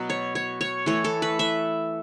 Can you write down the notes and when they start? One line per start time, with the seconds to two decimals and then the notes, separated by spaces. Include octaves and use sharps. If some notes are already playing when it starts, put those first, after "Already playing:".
Already playing: B2 F#3 B3
0.10 C#5
0.35 C#5
0.61 C#5
0.86 E3 A3 C#5
1.04 A4
1.22 B4
1.39 E5